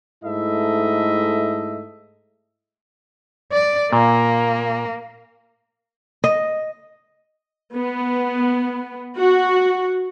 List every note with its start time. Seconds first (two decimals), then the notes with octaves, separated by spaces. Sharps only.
0.24 G#2 A3 E4 A4 D#5 E5
3.52 D5
3.93 A#2 A#3
6.24 D#5
7.74 B3
9.16 F#4